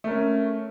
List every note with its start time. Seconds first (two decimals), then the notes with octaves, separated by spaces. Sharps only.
0.04 A3
0.07 A#4
0.10 C#4